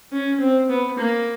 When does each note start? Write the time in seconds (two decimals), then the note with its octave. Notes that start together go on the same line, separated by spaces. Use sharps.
0.12 C#4
0.40 C4
0.69 B3
0.98 A#3